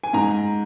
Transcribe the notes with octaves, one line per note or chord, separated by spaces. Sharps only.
G#5
G#2 A#5